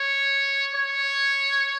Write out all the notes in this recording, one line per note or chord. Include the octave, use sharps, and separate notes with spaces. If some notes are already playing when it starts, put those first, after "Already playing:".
Already playing: C#5
C#5